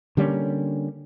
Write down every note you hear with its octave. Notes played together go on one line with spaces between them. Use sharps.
D3 G3 A#3 C#4